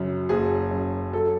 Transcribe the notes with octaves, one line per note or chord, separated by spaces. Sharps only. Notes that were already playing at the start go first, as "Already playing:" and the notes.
Already playing: F#2 C#3
F#1 G#4
F#2
F#3 A4